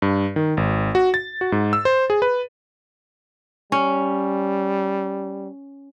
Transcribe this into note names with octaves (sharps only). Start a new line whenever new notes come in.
G2
D#3
G#1
F#4
A6
F#4
G#2
E6
C5
G#4
B4
G3 C#4